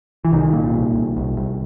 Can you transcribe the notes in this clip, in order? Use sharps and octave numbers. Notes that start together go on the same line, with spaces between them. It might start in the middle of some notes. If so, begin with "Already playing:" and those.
E3
C2 D#3
A#2
C2
C2
C2
C2